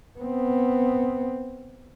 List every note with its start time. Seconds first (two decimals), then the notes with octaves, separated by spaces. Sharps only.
0.19 B3 C4